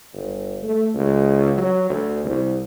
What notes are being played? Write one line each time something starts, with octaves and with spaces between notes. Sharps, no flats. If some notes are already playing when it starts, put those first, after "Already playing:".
G1
A3
C#2
F#3
D2
C2